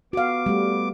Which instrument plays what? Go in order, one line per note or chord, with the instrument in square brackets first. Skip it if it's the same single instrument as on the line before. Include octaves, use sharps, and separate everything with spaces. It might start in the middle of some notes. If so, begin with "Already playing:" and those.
[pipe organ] B3 D6 [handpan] F#4 F5
[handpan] G3 A3